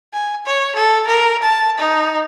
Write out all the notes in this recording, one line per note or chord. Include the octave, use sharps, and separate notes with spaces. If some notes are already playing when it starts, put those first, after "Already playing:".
G#5
C#5
A4
A#4
A5
D#4